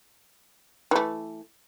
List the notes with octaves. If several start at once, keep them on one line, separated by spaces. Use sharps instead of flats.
E3 A3